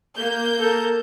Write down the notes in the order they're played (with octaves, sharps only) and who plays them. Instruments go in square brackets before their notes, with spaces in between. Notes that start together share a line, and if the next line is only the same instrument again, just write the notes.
[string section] A#3 G6
[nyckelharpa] A4 A#4